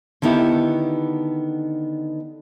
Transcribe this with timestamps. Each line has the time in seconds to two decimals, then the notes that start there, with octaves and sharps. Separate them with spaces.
0.22 D3 D#3 B3 D#4 E4 G4